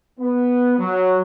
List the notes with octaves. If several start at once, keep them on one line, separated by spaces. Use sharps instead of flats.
B3
F#3